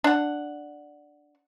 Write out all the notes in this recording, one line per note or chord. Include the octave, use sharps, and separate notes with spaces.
D4 F#5